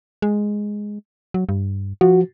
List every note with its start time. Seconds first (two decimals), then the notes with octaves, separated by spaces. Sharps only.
0.22 G#3
1.34 F#3
1.49 G2
2.01 F3 F#4